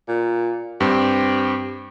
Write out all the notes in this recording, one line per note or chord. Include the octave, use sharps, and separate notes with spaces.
A#2
G2 C4 G4